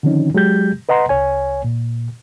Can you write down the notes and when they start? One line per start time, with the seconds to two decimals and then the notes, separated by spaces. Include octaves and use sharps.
0.03 D3 D#3 F3 C4 C#4 D#4
0.34 F#3 G#3 G4 G6
0.89 B4 D#5 F#5 A#5 C6
1.09 C2 C#5 G#5
1.64 A#2